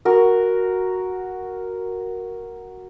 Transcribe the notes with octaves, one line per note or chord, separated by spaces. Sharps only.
F#4 A#4